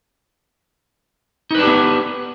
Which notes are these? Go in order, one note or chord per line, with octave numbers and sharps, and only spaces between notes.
B3 D4 D#4 G4 B4